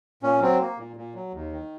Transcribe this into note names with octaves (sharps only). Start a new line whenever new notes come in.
A#2 C#4
F#3 C4
A#3
A#2
A#2
F#3
D#2
D#3